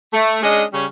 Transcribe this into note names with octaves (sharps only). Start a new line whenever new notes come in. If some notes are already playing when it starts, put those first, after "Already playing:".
A3
G#3 C#4 D4 G#4 D#5
C#3 G3 C#4